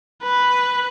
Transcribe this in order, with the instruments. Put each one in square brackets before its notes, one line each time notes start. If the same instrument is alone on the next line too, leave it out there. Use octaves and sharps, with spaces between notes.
[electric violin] B4